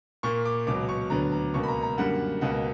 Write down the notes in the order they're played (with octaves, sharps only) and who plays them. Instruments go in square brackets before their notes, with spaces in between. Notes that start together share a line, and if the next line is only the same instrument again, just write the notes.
[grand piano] A#2 A#3 C#6
D6
C#2 B2 F#3 D6
C#6
D2 D3 F#3 B3 A#5
A#5
C#2 B2 A#3 C#6
B5
A#5
A#5
F#2 D3 G3 A#3 F#5
C#2 B2 A#3 F#5